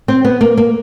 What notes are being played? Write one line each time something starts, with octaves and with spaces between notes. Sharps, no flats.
C4
B3
A#3
A#3